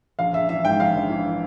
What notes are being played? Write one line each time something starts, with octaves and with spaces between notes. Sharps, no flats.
A#1 F5
A#1 E5
E3 E5
G#2 G5
A#1 F5
A#1
E3